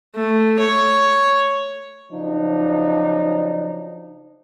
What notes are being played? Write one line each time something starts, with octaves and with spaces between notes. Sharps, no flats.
A3
C#5
C#3 F3 F#3 D4 D#4